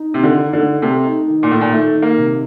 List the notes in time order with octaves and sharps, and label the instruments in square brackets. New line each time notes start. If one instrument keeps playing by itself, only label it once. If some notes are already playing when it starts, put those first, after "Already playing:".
Already playing: [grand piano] D#4
[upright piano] C3 [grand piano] D#3
[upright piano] D3
[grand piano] D#4
[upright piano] D3
[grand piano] A3
[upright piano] C3 [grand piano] A3
[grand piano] D#4
D#3
[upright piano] A#2
[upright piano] A2 [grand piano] D#4
[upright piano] A#2
[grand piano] D#3 [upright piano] A3
[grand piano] D#3
[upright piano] A#3
[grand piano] C3